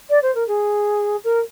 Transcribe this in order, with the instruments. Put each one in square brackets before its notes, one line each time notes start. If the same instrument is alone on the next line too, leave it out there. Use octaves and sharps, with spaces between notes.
[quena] D5
C5
A#4
G#4
A#4